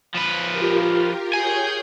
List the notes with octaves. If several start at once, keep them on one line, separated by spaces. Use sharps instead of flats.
F3 B4
F4 G4 A#4
G#4 C#5 G5 G#5 G6